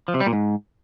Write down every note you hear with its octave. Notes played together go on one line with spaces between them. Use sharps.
F3
C3
G3
A#2
G#2